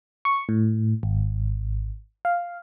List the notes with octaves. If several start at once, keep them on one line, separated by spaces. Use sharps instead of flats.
C#6
A2
G#1
F5